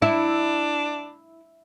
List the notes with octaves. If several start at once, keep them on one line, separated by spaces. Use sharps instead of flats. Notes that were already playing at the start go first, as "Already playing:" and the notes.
D4 E4